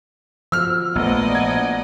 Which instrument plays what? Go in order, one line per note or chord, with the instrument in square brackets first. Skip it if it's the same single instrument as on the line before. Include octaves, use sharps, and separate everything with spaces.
[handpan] F3 F#4 [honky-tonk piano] E6 F6
[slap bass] A#1 [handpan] A3 B3 [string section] D5 D#5 F#5
[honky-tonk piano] G#6